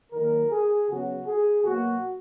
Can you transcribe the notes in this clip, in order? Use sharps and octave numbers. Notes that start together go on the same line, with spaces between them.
D#3 F#3 A#3 A#4
G#4
C#3 F#3 B3 F#4
G#4
B2 F#3 A#3 F#4